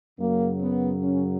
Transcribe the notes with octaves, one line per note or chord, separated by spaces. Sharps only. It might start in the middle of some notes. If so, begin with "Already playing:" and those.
F#2 C#3 F#3 A#3
B3
C#4